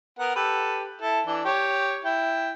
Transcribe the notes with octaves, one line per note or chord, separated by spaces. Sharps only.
B3 A#4 F#5
G4 A4 B4
E4 A4
E3 D4
G4 C#5
E4 G5